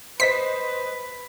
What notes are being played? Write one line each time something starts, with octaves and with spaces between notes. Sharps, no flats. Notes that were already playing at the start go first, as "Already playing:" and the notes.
B4 C5 D#5 B6 C7